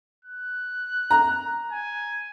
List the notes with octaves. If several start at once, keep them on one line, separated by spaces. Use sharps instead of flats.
F#6
A#5
G#5